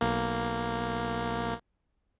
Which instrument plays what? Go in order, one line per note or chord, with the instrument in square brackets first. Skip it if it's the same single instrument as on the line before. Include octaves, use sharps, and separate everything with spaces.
[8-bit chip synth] B1 A#3